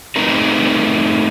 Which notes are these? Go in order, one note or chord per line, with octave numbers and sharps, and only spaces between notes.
A3 C4 D#4 A#4 B4